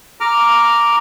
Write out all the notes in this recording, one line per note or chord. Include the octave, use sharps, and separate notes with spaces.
A#5 D6 F6